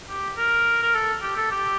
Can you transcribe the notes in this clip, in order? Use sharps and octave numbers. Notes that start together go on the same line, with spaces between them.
G4
A#4
A#4
A4
G4
A4
G4